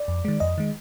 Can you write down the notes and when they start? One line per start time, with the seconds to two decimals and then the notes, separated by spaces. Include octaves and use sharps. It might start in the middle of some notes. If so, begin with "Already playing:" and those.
Already playing: D5
0.08 F2
0.25 D#3 G#3
0.40 F2 D#5
0.58 D#3 G#3